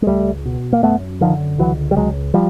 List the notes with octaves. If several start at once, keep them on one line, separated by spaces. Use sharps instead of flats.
G#3
C#2 G3 A3
B2
A#3
F#2 A3 B3
D3 D#3 F3
C#2 E3 F#3
G3
C#2 F#3 G#3
F3 G3